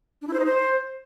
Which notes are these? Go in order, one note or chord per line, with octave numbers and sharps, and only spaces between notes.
D4
E4
C5
D#4
C5